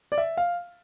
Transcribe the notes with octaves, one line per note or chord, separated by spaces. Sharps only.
D5
E5
F5